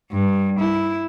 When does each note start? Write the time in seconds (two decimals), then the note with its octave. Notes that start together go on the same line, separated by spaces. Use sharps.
0.12 G2
0.60 E4